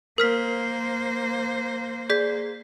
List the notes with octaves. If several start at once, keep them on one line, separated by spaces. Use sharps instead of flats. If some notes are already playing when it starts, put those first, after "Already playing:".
A#3 A#4 C5 F6 B6
G#4 D5 G6 B6